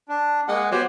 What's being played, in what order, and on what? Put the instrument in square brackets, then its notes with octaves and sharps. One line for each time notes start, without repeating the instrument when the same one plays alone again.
[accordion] D4
[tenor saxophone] G#3 [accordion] A#3 F#5
[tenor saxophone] F#3 [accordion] B3 G4 C5